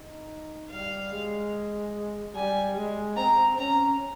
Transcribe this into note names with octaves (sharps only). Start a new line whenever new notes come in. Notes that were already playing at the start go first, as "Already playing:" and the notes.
Already playing: D#4
G3 F5
G#3
G3 G#5
G#3
C4 A#5
C#4 A#5